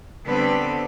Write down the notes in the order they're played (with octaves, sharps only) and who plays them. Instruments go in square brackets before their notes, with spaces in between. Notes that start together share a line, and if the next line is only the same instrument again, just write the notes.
[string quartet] D3 G3 B3 C4 A4 B4